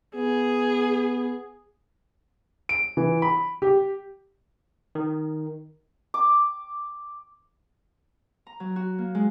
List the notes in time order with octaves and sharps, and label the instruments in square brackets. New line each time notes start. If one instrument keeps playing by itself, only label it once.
[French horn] B3 [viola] G#4
[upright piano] D7
E3
B5
G4
[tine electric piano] D#3
[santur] D6
[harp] A#5
F#3
F#4
A#3
G#3